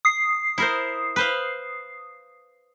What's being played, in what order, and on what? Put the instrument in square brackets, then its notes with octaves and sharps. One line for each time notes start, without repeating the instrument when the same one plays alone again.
[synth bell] D#6 C7
[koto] E4 A#4 C5
B4 C5 F5